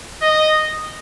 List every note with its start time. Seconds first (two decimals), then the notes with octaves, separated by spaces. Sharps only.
0.22 D#5